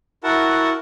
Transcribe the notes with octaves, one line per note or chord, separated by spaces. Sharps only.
E4 F#4 A#4 F#5 A5